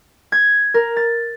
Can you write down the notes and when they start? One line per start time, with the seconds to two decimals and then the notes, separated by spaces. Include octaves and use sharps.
0.32 G#6
0.74 A#4
0.97 A6